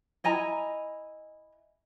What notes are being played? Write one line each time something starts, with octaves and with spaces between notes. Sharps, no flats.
E4 D#5 G#5 A#5